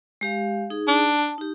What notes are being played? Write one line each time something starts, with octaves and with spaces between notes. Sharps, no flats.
G#3 G4 F5
D#4 G#4
D4
A5
D#4 G4